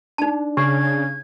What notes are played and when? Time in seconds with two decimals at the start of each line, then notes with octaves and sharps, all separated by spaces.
0.18 D4 D#4 A5
0.57 C#3 G4 G#6